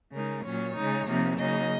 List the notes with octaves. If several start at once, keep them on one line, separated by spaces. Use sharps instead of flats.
C#3 G#3 D#4 A#4
A#2 F#3 C#4 C#5
C#3 G#3 D#4
C3 F3 A#3 D#4
C#3 F#3 A#3 D#4 D#5